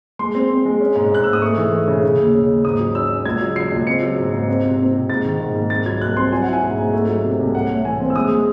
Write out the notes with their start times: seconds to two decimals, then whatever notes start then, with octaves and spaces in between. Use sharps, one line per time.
0.19 G#3 C6
0.35 C4
0.50 C4
0.65 G#3
0.81 C#4
0.96 G#2
1.12 G#2 F#6
1.24 G#2 E6
1.33 D#6
1.42 A3 C#6
1.57 E3
1.73 A3
1.88 C#3
2.03 C#3
2.18 D#2
2.34 C#3
2.49 D#2
2.64 G#2 D#6
2.80 F#3
2.95 C#4 E6
3.11 C#4
3.25 C#2 G#6
3.41 F#3
3.56 F#3 C7
3.72 C#2
3.87 C4 C#7
4.02 F#3
4.18 G#2
4.33 G#2
4.48 C4
4.64 C3
4.79 C4
4.94 C3
5.10 G#2 A6
5.25 D#3
5.40 G#2
5.55 G#2
5.70 C2 A6
5.86 F#3 G#6
6.01 C2 F#6
6.17 C4 C6
6.32 F#3 G#5
6.42 E4 F#5
6.53 G#5
6.63 G#2
6.78 G#2
6.93 A3
7.09 F#3
7.24 C3
7.39 C2
7.55 A2 F#5
7.70 A2
7.85 E3 G#5
8.00 C4
8.10 E6
8.16 G#3 D#6
8.31 G#3